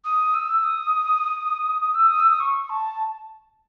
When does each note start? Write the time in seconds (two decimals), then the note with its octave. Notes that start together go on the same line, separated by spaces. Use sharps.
0.04 D#6
0.34 E6
0.64 D#6
1.81 D#6
1.94 E6
2.07 D#6
2.20 E6
2.30 D#6
2.40 C#6
2.70 A5